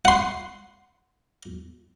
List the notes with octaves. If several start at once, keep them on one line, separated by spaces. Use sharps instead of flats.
F#5 C6